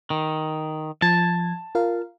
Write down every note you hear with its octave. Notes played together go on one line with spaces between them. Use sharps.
D#3
F3 A5 G#6
F4 A#4 F5